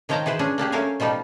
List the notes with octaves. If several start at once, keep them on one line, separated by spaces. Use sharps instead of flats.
D#3 F3 C#5 G5 A5 A#5
E3 G#4 B4 C5
C#4 D4 G#4
A#3 D4 G4 G#4
F#3 A3 C#4 A#4 F5 G#5
B2 F3 G3 D#4 F4